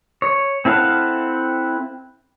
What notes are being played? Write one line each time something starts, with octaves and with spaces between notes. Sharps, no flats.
C#5
C4 E4 A4 F5 F#5